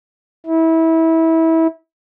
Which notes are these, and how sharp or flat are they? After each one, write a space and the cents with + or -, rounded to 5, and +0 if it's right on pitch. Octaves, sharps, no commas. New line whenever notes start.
E4 -25